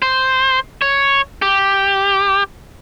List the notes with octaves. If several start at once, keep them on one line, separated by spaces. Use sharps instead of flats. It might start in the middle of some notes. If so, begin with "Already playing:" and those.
C5
C#5
G4